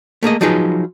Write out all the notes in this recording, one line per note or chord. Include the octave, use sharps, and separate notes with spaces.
A3 A#3 G#4 D#5
F3 F#3 D#4 F4 G#4 B4